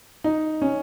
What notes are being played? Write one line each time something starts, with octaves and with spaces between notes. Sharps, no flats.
D#4
C#4